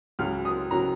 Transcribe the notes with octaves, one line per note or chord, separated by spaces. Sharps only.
C#2 C#3 F#3 F6
D#6
C#3 F#3 A#5